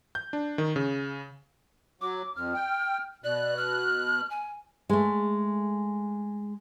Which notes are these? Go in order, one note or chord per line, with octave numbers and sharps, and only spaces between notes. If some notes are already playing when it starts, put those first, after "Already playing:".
G6
D4
D#3
C#3
F#3 D6
F2 F6
G5
B2 D5 F#6
F6
G#5
G#3 A3